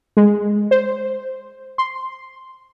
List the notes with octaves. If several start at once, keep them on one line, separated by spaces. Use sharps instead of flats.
G#3
C5
C6